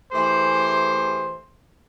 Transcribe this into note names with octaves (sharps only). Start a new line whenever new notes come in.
E3 A3 G4 G#4 C5